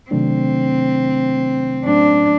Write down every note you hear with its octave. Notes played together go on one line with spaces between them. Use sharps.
C3 D#3 F#3 A3 C4 D4
A2 F#3 A3 C#4 D4